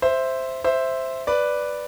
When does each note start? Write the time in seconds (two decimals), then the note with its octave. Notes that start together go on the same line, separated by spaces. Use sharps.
0.02 C5 E5
0.64 C5 E5
1.27 B4 D5